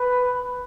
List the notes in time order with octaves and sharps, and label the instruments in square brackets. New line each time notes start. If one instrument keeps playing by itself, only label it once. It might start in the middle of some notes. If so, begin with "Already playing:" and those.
Already playing: [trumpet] B4